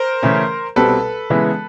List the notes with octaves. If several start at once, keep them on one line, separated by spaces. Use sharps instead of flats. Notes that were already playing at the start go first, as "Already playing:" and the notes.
Already playing: A#4 C5
C#3 E3 A3 C#4
C2 B2 G3 C4 A4 B4
C#3 E3 G#3 B3 E4